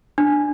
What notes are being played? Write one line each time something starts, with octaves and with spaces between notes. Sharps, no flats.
D4